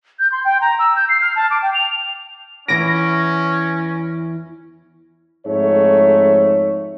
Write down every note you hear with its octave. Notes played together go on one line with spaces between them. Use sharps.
G6
C6
G5
A#5
E6
G6
C7
F6
A5
D6
G5
F7
E2 E3 C#4 A#6 D7
F2 G#2 A3 C#5